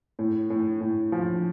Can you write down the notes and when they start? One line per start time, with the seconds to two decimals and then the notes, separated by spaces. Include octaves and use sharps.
0.19 A2
0.50 A2
0.81 A2
1.12 F3